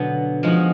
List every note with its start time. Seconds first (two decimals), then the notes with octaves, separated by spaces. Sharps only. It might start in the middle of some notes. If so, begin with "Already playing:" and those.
Already playing: B2 D3 F#3 B3
0.43 F3 G#3 D#4 F#4